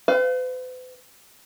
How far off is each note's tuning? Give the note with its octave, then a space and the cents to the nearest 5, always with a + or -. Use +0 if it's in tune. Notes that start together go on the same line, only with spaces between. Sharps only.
B4 +45 F5 +0